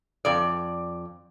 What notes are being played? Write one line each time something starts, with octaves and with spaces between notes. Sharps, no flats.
F2 D5